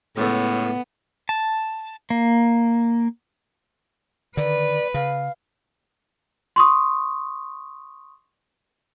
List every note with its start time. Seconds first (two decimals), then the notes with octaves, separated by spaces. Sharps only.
0.17 C#2 A2 A3 B3
1.29 A5
2.10 A#3
4.37 D3 D#3 B4 D5
4.94 C#3 F5
6.56 C6 C#6 D#6